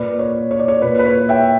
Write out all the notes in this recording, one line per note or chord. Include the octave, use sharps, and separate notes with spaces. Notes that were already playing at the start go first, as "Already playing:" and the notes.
Already playing: A#2 B4 D5
C#5
C#5
D5
C#5
A#2 B4
B4
C#5
E5 G5